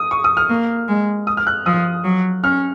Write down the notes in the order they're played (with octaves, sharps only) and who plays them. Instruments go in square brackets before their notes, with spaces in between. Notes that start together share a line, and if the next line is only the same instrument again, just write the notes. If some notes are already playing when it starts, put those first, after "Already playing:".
Already playing: [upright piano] D#6
C#6
D#6
F6
[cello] A#3
G#3
[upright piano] D#6
F6
F#6
[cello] F3 [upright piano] D#6
[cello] F#3
[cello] C#4 [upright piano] F6